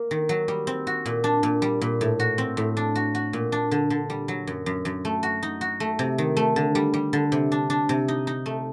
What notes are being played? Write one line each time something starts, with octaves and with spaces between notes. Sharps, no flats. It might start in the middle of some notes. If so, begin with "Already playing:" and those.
Already playing: A#3
D#3
F#3
G3
C4
F#4
A#2
D4
A#2
G3
A#2
A2
F#4
C4
A2
D4
F#4
F#4
A#2
D4
D3
D3
G3
F#3
F#2
F#2
F#2
A3
F#4
D#4
F#4
A3
C3
D#3
A3
D3
G3
G3
D3
C3
D4
D4
C3
D#4
D#4
A3